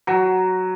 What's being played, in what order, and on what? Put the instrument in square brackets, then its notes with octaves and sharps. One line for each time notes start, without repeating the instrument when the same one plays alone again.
[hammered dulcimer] F#3